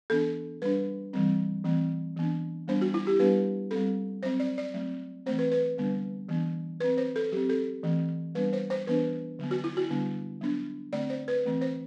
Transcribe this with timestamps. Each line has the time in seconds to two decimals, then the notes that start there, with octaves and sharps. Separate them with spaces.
0.10 E3 B3 D4 A4
0.62 G3 D4 B4
1.13 E3 G3 C4
1.64 E3 A3 C4
2.17 E3 B3 D4
2.68 G3 B3 D4 C5
2.81 F#4
2.94 E4
3.07 G4
3.19 G3 B3 D4 B4
3.71 G3 C4 A4
4.23 F#3 C4 C5
4.40 D5
4.58 D5
4.74 F#3 A3 C4
5.26 E3 A3 C4 C5
5.39 B4
5.52 B4
5.78 D3 G3 B3 D4
6.29 E3 B3 D4
6.80 F#3 B4
6.84 C4
6.98 C5
7.16 A4
7.32 F#3 G4
7.36 C4
7.49 A4
7.83 E3 A3 C4
8.35 G3 B3 D4 B4
8.53 C5
8.70 C5
8.87 E3 B3 D4 B4
9.39 D3 F#3 B3
9.51 F#4
9.64 E4
9.77 F#4
9.89 D3 G3 B3 D4
10.41 F#3 B3 D4
10.93 D3 A3 C4 D5
11.10 C5
11.28 B4
11.45 E3 A3 C4
11.61 C5